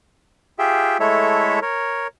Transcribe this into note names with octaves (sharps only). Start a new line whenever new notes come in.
F4 G4 G#4 E5 G5
G#3 A3 E4 A4 C#5 E5
A#4 C#5